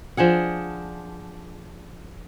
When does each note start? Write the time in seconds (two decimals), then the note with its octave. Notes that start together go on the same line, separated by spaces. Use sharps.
0.17 F3 D4 G#4 F#5